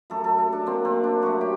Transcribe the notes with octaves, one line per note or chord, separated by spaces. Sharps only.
F#2 F#3 A3 A4
A4
A4
D4
F#2 F#3 A#3 C4
C4
D4
F#2 F#3 A3 F#4
G4